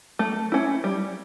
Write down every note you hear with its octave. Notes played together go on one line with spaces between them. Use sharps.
A3
C#4 E4
G3